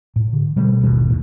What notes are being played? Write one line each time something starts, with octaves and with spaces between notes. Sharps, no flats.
A2
D3
B2 G3 A3
G#1 D#2 B2 E3
D#2 A2